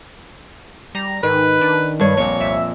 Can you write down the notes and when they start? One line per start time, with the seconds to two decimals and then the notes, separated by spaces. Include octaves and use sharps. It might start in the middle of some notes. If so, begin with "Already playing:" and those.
0.95 G3 A#5
1.23 G#2 D#3 B4
1.61 D4
2.00 G2 B4 C#5
2.17 A#1 F2 A#2 C#5
2.40 C2 E5